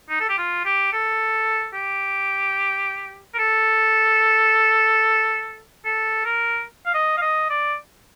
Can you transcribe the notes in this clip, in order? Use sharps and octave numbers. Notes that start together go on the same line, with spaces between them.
D#4
A4
G4
F4
G4
A4
G4
A#4
A4
A4
A#4
F5
D#5
F5
D#5
D5